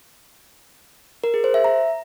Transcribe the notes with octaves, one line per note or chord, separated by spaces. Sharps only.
A#4
G#4
C5
E5
A#5